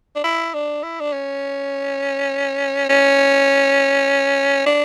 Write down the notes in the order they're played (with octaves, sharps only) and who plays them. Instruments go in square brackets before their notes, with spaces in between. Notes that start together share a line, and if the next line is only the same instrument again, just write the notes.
[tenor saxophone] D4
E4
D4
E4
D4
C#4
C#4
D4